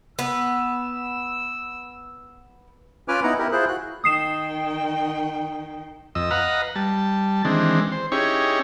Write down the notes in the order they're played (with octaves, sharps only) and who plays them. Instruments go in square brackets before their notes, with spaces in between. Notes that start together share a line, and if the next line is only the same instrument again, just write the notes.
[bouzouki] B3 [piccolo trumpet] E6
[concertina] C#4 F4 B4 G#5 D6 F6
B3 D#4 E4 F#5 A#5
E4 G4 A#4
E4 F4 G#4 C5 F#6
F#4 F#6
[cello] D#3 G5 [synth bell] D#6 C7 E7
[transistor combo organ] F2 D#5 E6
B4 D#5 F5 F#5 A#5
G3 A5
D#3 E3 G#3 C4 D4
C5
C#4 D#4 E4 G4 G#4 C#5